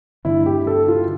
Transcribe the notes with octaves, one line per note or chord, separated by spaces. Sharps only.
G2 D3 A3 D4 E4
G4
A4
F4